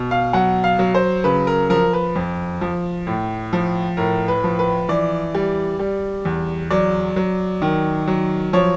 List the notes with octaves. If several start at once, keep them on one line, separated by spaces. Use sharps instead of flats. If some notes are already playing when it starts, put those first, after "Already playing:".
Already playing: B2
F5
F#3 F#5
F5
F#3
C5
C#3 B4
A#4
F3 A#4
B4
F2
F3
A2
F3
A2 A#4
B4
F3
B4
E3 D5
G3
G3
E2
F#3 D5
F#3
D#3
F#3
F3 C#5